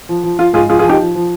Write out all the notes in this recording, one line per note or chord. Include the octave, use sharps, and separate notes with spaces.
F3
F3
F3 F4
G#2 F4 G#4
F3 F4 G#4
F4 G#4
F3 D#4 G4
F3
F3